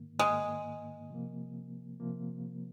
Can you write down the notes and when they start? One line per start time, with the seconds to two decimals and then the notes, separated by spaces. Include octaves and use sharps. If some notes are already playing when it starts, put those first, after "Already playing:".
Already playing: G#2 D#3 A#3
0.19 G#2 D#3 G#3 A#3
1.10 C3 F3 A#3
2.00 C3 F3 A#3